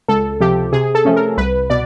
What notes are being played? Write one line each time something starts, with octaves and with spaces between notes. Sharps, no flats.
C#2 A4
C3 F3 G4
C3 G#4
A4
F3 A3 C#4
A#4
C2 B4
B2 D5